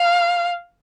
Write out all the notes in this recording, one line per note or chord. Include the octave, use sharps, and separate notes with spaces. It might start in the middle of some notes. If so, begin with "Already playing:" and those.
Already playing: F5